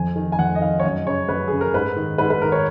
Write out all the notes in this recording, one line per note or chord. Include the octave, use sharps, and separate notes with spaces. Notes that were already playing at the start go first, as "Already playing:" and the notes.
Already playing: F2 G#5
D#3
G#5
F2 F#5
D#5
D#3 F5
C#5
F#2 D#5
C#3 C#5
F#2 B4
C#3 G#4
A#4
G#2 B4
D#3
G#2 B4
B4
D#3 A#4
C#5